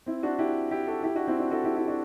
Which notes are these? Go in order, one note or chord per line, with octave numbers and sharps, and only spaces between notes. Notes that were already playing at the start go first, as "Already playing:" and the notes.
C4 E4
D4 F#4
E4 G4
E4 G4
F#4 A4
E4 G4
D4 F#4
C4 E4
D4 F#4
F#4 A4
E4 G4
E4 G4
D4 F#4